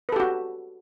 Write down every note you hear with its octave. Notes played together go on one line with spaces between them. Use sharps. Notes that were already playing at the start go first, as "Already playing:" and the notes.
F#4 G4 A4 B4